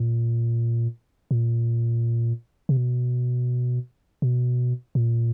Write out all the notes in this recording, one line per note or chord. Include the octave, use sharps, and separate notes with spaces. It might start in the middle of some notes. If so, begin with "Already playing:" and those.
Already playing: A#2
A#2
C3
B2
B2
A#2